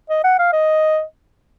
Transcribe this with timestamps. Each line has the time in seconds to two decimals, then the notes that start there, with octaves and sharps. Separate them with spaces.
0.10 D#5
0.24 F#5
0.39 F5
0.53 D#5